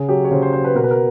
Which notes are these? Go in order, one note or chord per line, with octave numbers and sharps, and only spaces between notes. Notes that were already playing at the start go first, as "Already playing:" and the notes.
Already playing: C#3 G#4
F#3 G4
C#5
C#3 C5
C5
F#3 C5
B4
B2 A#4
B4
A#4